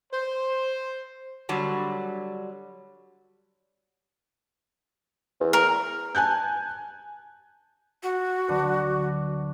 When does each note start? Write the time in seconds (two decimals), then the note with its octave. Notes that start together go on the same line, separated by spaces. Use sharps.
0.13 C5
1.49 D3 F#3 G3
5.41 E2
5.53 A#4
6.15 G#5 A5 F#6 G6
8.03 F#4
8.48 D2 D3 F#3 D4 B4